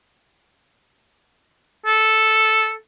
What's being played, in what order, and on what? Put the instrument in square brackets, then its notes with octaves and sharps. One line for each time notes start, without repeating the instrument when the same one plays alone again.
[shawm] A4